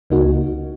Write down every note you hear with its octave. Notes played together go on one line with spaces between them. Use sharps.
C#2 C#3 A#3 D#4 F#4